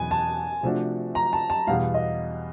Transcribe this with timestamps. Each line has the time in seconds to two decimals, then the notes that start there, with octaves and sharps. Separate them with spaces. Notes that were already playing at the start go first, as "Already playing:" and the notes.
Already playing: E2 B2 F#3 B3 G#5
0.11 A5
0.63 C3 F3 A3 D4 F#4
1.15 A#5
1.33 A5
1.50 A5
1.67 E2 B2 G3 F5
1.94 D#5